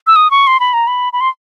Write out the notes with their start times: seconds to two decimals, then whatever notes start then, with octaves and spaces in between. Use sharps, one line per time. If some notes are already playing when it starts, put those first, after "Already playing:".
0.07 E6
0.16 D#6
0.31 C#6
0.47 C6
0.60 B5
0.74 A#5
0.87 B5
1.13 B5
1.21 C6